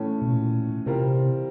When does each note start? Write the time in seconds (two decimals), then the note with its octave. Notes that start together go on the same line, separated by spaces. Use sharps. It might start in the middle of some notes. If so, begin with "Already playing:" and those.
Already playing: A2 E3 A3 C#4
0.22 B2
0.32 A#2
0.86 C3 E3 G3 C4 F4 A#4